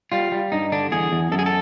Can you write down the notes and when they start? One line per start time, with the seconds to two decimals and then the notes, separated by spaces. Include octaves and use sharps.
0.12 G3 F4
0.32 G3
0.52 G2 D#4
0.72 D3 D4
0.92 E2 G#4
1.12 E2
1.32 F#2 A4
1.39 G#4
1.46 A4